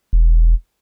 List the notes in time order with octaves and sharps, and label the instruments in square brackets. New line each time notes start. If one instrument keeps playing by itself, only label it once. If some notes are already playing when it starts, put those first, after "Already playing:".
[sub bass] E1